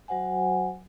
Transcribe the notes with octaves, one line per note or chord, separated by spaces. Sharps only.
F#3 F#4 C5 F#5 G#5